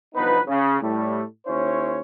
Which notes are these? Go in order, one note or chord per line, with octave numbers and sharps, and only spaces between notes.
G1 E2 F3 B3 D#4 B4
C#3
A2 G3 A3
D#2 C#4 E4 C5 C#5